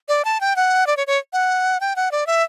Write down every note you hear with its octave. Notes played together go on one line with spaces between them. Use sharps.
D5
A5
G5
F#5
D5
C#5
C#5
F#5
G5
F#5
D5
E5